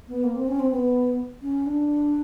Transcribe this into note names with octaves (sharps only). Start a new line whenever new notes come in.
B3
A#3
C4
C#4
C4
B3
C#4
D4